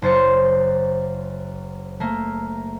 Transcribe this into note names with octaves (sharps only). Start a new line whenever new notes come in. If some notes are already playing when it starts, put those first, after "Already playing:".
F#1 C5 A6 C#7
A3 A#3